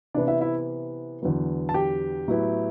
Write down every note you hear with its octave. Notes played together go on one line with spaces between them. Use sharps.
C3 E3 B3 D4 E4 D5
E4 E5
E4 E5
E2 D3 F#3 B3
A5
G4 G5
A2 F#3 B3 E4